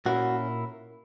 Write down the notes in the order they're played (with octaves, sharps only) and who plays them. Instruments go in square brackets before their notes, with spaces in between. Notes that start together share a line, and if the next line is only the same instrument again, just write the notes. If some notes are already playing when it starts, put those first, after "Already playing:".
[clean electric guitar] A#2 A#3 C#4 E4 F#4